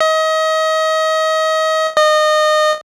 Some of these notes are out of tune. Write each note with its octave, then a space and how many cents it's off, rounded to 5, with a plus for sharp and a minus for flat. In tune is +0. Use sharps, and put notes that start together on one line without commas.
D#5 +30
D#5 -25